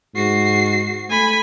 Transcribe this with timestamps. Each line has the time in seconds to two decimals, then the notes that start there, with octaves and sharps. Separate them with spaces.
0.16 G#2 F#4 C7
1.10 A3 G#5 B5